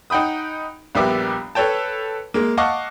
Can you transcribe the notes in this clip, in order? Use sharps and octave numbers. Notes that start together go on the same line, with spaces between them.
D#4 F#5 G5 B5 D#6
A#1 G3 B3 E5 D6 E6
A4 B4 C#5 G5 A5
G#3 A#3
D#5 F5 F#5 A5 C#6 D6